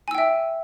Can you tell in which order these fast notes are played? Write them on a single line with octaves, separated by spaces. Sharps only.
G#5 E6 G5 E5